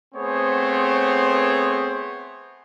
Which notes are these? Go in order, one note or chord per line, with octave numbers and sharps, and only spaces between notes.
A3 B3 C4 G#4 C5 C#5